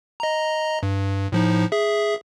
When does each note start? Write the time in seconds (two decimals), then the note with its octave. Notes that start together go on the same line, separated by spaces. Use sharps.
0.20 D#5 A#5
0.83 G2
1.32 A2 F3 D#4
1.72 G#4 E5